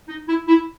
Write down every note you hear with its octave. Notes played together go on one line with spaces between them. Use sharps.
D#4
E4
E4